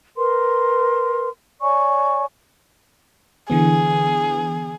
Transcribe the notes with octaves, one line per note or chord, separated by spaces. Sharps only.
A#4 B4 C6
C#5 D5 G#5 C#6
D3 E3 B3 G#4